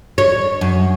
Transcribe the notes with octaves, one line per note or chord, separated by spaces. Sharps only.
C#5
F#2